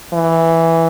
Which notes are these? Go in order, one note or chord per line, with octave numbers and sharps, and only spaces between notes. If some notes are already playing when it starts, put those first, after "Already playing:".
E3